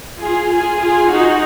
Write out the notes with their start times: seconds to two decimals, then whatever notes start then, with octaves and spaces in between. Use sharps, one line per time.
0.22 F4 G#4
0.51 F4 G#4
0.81 F4 G#4
1.10 D#4 F#4